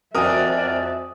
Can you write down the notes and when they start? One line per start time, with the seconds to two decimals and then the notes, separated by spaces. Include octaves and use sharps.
0.15 F2 F#4 A#4 D5 E5 G#5 D#6